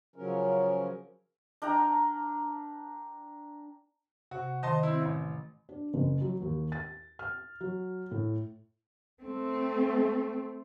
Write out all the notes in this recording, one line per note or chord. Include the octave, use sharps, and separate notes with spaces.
C#3 F3 F#3 C#4 A#4
D4 A#4 G5 A#5
C3 F#4
D#3 C5 D#5 A5 C6
C4 E4
A1
D4
F#1
F#3
D#2
A6
F6
F#3
A2
A3 C4